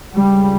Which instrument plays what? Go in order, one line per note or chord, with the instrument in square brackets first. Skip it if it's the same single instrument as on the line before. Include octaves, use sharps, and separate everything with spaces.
[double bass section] C#2 C#3 G3